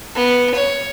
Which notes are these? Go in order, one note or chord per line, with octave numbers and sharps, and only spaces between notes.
B3
C#5